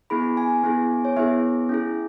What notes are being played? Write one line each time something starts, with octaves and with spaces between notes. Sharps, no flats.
B3 E4 G#4 B5
G#5
B3 E4 G#4
C#5
B3 E4 G#4 E5
C#4 E4 G#4